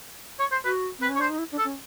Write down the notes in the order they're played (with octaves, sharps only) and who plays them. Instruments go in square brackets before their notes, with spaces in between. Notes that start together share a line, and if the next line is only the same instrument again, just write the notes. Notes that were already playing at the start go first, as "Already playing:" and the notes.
[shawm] C#5
C5
[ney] F#4 [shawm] B4
[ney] C4 [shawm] B4
[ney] C#4
[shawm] C#5
[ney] D4 [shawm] C5
[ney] D#4
E4
D4
[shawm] A4
[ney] C#4